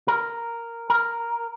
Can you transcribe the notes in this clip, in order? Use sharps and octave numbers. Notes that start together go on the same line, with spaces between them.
A#4
A#4